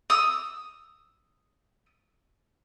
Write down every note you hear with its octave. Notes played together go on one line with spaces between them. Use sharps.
D#6 E6